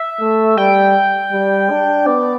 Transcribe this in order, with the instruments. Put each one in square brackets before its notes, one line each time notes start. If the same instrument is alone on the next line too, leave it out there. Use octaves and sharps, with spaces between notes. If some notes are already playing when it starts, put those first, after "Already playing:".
Already playing: [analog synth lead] E5
[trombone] A3
[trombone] G3 [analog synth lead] G5
[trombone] G3
D4
[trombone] B3 [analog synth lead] D5